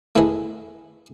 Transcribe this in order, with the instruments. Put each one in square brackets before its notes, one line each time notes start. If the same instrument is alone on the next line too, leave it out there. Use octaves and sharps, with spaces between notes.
[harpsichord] A3 E4 G#4 B4 D#5